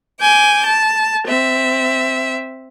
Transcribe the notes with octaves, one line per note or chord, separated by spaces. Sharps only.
G#5 D6 G6
A5
C4 E5